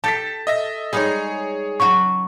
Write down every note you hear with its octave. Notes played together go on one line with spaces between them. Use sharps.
G4 A4 A5 A6 B6
D#5 E5 A#6
G3 G#3 D#4 G#4 C#5
C#3 F#3 F#4 C#6